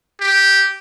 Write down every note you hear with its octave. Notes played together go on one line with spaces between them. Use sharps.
G4